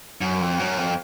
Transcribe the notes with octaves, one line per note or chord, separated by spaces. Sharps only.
F#2
F2
F#2
F2